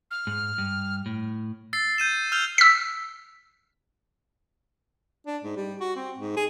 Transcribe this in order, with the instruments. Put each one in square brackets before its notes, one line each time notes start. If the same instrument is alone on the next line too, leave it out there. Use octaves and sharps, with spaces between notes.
[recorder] F6
[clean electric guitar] G#2
G2
A2
[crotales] E6 A6 C7
G6 D#7 E7
E6 F6 G6 F7 G7
[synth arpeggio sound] E6 B6
[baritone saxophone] D4
G#2
G3
F#4
C4
G#2
G#4